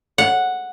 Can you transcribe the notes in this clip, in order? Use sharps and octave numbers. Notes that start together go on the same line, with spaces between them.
F#5